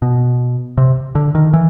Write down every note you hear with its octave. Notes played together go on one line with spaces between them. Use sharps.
B2
C3
D3
D#3
E3